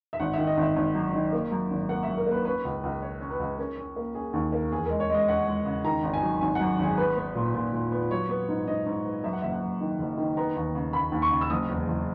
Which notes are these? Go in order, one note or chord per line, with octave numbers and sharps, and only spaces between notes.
E5
G#1 F#5
D#3 E5
D#5
G#1 E5
G#1
F#2
D#3
A#3
F#2
G#1
A#3 F#5
E5
F#2
A#4
A#3 B4
C#4 B4
C#2
C#2
C#4 C#5
C#4
B4
C#2
C#4 A#4
C#4
A#3
C#4 G#4
D#2
A#3
E2 G#4
G#3 A#4
C#5
G#3 D#5
C#4 F#5
G#3
C#3
D#3 A#5
G#1
G#5
F#3
G#1 G#5
F#2 F#5
G#1 G#4
B3 B4
B3
A#2
A#2
A#2
B3
F#3 C#5
B3
G#2
G#2 D#5
G#2
B3
F#2 E5
F#5
F#1 E5
F#5
F#1
D#3
F#1
D#3
B3 A#5
D#2
C#3
C#3 B5
D#2
C#6
C#3
E6
F#1 D#6
E2
F#1